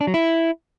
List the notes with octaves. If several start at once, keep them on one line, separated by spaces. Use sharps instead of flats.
D4
F#3
E4